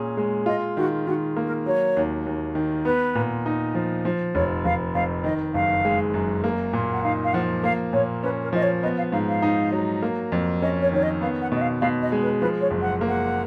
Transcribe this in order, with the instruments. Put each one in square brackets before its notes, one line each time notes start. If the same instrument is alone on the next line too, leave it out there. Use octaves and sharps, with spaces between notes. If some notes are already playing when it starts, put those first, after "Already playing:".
Already playing: [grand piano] A#2 C#4 G#4
G#3
[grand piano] F4 [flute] D#5
[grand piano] D#3 [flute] F#4
[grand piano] D#3 [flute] F#4
[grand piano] A#3
[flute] A#4
[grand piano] F#3 [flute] C#5
[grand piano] D#2
D#2
D#3
[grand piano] B3 [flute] B4
[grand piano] A#2
D#4
F3
F3
[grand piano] F1 [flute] C#5
[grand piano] F1 [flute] F5
[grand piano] F2 [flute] F5
[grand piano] D#3 [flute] D#5
[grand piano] F#1 [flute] F5
[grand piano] G#3
F#2
A#3
A#2
[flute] F#5
[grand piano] D#4 [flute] F5
[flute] F5
[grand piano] F3 [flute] F#5
[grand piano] A#3 [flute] F5
[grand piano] A#2 [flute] C#5
[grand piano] C#4 [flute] B4
[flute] A#4
[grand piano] F3 [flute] D#5
[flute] C#5
[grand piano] B3 [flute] D#5
[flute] F5
[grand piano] G#2 [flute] F5
[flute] F5
[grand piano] D#4
F#3
A#3
F2
[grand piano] C#4 [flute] D#5
[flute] C#5
[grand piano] D#3 [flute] C#5
[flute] D#5
[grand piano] B3 [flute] F5
[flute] F#5
[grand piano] B2 [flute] D#5
[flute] F5
[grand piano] B2 [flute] F5
[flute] D#5
[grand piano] G#3
[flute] B4
[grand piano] F3 [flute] B4
[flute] C#5
[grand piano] F#1
[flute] F#5
[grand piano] A#3
[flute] F#5